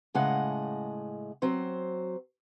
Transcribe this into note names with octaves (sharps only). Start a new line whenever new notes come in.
A2 C#3 G#3 D#5 F#5
F#3 C4 C5